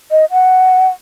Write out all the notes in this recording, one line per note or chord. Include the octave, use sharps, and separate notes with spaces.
D#5
F#5